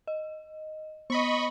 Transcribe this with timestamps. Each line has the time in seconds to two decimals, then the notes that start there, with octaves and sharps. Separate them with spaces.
0.07 D#5
1.10 B3 D#5 B5 C#6